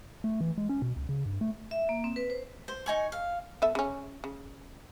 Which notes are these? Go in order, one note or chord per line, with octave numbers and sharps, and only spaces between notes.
A3
E3
G#3
C#4
B2
C#2
C#3
G2
A3
E5
A#3
C4
B4
C5
C5
D#4 G#5 C#6
F5
B3 A4 E5
C#3 C#4
C#3